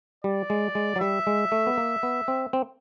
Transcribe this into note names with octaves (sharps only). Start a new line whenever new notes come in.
G3 D5
G#3
G#3
F#3
G3 E5
G#3
A3
B3
A#3
B3
C4
C4